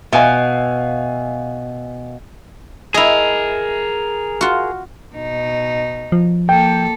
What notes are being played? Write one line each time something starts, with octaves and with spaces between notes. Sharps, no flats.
B2 E5 F5 G#5
E4 G#4 A#4 D#5
F4 F#4
B2 D#4
F3
A#3 A4 G5